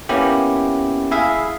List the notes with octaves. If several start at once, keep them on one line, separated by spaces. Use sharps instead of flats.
A#3 B3 C#4 E4 G4
E4 G#4 E5 F5